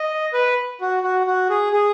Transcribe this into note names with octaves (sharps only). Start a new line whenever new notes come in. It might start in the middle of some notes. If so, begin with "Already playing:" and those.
Already playing: D#5
B4
F#4
F#4
F#4
G#4
G#4